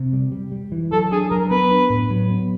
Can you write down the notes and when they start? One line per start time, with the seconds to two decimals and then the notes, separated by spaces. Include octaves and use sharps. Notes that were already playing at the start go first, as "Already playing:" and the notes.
Already playing: C3
0.13 G3
0.32 G3
0.52 G3
0.72 E3
0.92 F#3 A4
1.12 D4 G#4
1.31 F#3 A#4
1.50 B3 B4
1.71 D4
1.90 A2
2.10 F#3
2.30 B3